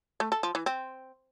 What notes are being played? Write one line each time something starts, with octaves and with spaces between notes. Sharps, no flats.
A3
A4
F3
E3
C4